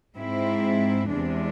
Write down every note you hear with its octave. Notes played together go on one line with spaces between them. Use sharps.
G#2 G#3 C4 E4
E2 C3 G#3 D4